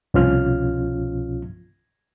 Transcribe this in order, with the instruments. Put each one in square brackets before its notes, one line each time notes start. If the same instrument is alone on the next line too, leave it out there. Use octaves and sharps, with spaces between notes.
[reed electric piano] C2 B2 F3 C#4 F4 F6